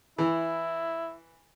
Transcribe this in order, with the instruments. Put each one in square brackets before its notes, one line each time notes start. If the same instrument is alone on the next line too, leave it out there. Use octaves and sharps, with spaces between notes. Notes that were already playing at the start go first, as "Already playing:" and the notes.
[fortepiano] E3 [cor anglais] E4